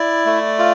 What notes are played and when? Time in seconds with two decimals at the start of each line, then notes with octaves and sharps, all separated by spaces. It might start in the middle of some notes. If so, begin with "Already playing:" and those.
Already playing: E4 D5
0.26 A3
0.59 F4